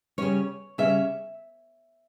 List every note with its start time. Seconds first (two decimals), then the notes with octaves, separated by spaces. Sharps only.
0.18 C#3 G3 C#4 C#5
0.78 C#3 G3 C#4 E5